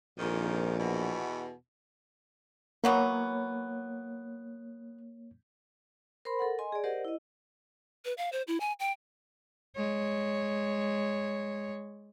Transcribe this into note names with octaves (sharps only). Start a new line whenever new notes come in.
A#1 F2 G#2 D#3
E2 B2
E3 F#3 A#3 B3 C#5
A#4 C5 B5 C6
A4 A#4 F#5
D#5 G#5 C6
G#4 D5
G4 A#4 C5 D5 D#5 F#5
E4 D#5
B4
F5
C5
E4
G#5
G5
G#3 C#5